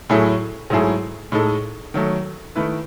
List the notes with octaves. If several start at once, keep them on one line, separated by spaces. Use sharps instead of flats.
A2 F#3 A3 E4 G#4
G#2 F#3 A3 E4 G#4
A2 G#3 D#4 A4
D#3 F#3 A3
D#3 A3 E4 B4